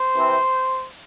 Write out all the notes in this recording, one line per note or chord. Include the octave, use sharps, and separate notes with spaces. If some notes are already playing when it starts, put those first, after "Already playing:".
Already playing: C5
C3 E3 C4